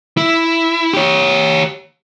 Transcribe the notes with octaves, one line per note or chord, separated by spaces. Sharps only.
E4
G4 C#5